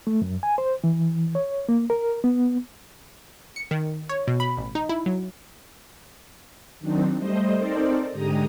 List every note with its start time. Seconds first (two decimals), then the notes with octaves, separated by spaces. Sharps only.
0.07 A3
0.22 F#2
0.43 G#5
0.58 C5
0.84 E3
1.35 C#5
1.69 A#3
1.90 A#4
2.24 B3
3.56 C#7
3.71 D#3
4.09 C#5
4.28 B2
4.40 B5
4.57 A1
4.75 D#4
4.89 E4
5.06 F#3
6.80 D#3 F#3 C4 D4 D#4
7.16 G3 A3 C5 D#5
7.56 C4 D#4 A4 A#4 C5 D5
8.12 G#2 D3 G#3 G4 A#5 D#6